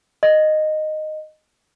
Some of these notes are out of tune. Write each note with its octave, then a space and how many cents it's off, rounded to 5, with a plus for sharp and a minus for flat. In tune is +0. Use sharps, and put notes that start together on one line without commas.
D#5 -10